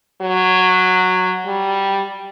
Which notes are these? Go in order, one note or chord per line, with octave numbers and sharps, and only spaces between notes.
F#3
G3